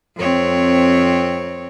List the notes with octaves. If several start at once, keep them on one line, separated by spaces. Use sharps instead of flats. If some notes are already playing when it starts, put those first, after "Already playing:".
F2 C4 C#5